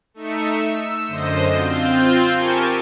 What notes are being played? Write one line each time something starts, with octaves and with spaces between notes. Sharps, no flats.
A3 D#4 E5 C#7
E6
F#2 D3 C5 D#5
C4 F4 G6
G4 A#4 G#5 A5 C#6